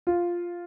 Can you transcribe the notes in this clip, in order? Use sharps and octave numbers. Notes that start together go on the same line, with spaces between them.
F4